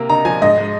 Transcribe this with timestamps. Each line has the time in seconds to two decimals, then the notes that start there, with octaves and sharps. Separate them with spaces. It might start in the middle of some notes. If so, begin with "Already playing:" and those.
Already playing: C3 A#3
0.09 D#4 A#5
0.25 F3 G#5
0.42 G#2 D#5
0.58 G#3